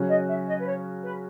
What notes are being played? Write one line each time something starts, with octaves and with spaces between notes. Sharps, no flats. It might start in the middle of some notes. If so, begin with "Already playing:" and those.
Already playing: C#3 F#3 C#4 F#4
D#5
E5
D#5
B4
C#5
B4